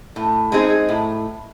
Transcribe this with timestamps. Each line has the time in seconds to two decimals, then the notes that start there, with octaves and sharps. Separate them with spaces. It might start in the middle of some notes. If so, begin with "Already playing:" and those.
0.16 A2
0.52 G#3 C4 D#4 G#4
0.89 A2